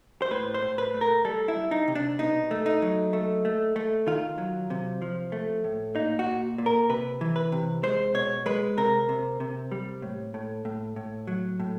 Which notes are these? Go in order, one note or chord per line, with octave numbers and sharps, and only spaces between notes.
C5
A2 B4
C5
A2
B4
A3
A#4
G3 A4
E4
G3
D#4
C3
D4
B2 D#4
A3
D#4
F#3
A3
A3
A3
D#3 F4
F#3
C3
F3
A3
A2
A#2 D#4
F#4
A#2
A#2
A#4
C3 B4
E3
B4
C3
G#3 C5
B2 C#5
G#3 B4
C3 A#4
C3
C3
G3
A2
A2
A2
A2
F#3
A2